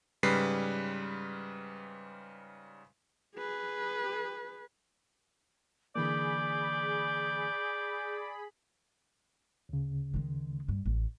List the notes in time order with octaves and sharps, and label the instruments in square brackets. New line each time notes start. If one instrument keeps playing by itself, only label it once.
[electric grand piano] G#2 C#3 G3 B4 B6 C7
[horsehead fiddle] G#4 B4
[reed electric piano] D3 E3 A#3 [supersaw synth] G#4 B5 [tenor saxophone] D5 [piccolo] G6
[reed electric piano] D2 C#3
[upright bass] D#3 G#3
G2
A1